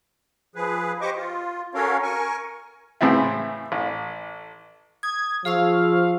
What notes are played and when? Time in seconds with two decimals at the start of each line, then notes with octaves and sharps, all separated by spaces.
0.55 F3 G#4 B4
1.01 G4 C5 D#5 C#6 D6
1.16 F4
1.74 C#4 F#4 A4 A#4 C#5 F5
2.03 A#4 G#5 C#6
3.01 A2 C#3 E3 C4 E4
3.72 A1
5.03 D#6 G#6
5.45 F3 G#4 F5 C#6 E6